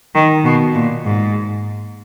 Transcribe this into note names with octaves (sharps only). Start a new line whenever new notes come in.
D#3
B2
A#2
G#2